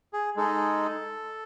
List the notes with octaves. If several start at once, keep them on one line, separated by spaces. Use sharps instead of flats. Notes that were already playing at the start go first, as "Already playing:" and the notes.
G#4
G#3 D#4 G#4 A4